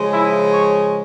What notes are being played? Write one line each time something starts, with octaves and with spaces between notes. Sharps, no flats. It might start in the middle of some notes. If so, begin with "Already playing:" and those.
Already playing: C#3 F3 G#3
E4
C#5